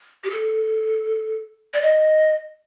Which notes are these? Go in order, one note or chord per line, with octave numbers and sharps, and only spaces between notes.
G4
A4
D5
D#5